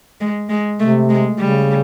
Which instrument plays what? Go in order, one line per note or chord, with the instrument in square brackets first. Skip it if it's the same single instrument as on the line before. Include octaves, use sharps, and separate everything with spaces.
[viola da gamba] G#3
G#3
[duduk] C3 [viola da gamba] A3
[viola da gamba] G#3
[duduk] C#3 [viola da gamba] G3